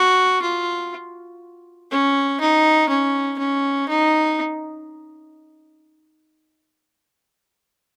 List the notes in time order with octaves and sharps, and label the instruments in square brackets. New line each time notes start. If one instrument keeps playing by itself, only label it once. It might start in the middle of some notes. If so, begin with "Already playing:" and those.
Already playing: [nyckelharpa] F#4
F4
C#4
D#4
C#4
C#4
D#4